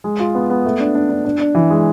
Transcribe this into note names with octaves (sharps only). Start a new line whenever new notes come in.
G#3
F4
B3
B3
A3
D4
D4
D4
D4
D4
E3
G#3